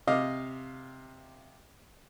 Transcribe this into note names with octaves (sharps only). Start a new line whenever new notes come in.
C3 D#5 F5 D6